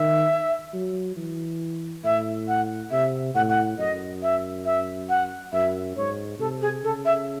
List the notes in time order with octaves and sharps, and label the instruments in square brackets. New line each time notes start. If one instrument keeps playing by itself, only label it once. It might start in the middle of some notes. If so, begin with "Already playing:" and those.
Already playing: [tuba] D#3 [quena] E5
[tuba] F#3
E3
[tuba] A2 [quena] E5
[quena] F#5
[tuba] C3 [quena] E5
[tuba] A2 [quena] F#5
[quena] F#5
[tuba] F#2 [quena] D#5
[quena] E5
E5
F#5
[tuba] F#2 [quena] E5
[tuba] G#2 [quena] C#5
[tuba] C3 [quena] A4
[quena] G#4
[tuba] C#3 [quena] A4
[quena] E5